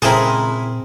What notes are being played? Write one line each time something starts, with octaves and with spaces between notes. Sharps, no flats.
C#2 A#2 C4 E4 G#4 A#4 D#5 A5